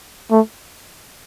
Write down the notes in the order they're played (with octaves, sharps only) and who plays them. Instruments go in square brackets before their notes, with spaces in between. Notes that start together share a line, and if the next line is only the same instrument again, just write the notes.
[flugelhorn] A3